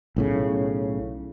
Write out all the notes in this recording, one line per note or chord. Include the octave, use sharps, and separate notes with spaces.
B1 A2 C#3